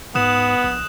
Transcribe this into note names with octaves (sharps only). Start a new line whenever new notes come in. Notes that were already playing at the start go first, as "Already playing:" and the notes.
G#2 B3 D#6 F#6 E7
A#1